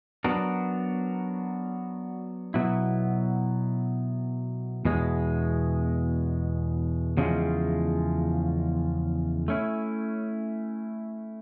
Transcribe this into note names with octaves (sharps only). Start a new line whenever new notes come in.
F#3 B3 D4 F#4 A#4
B2 F#3 B3 E4
E2 B2 G#3
E2 C#3 F3 G#3
A3 C#4 E4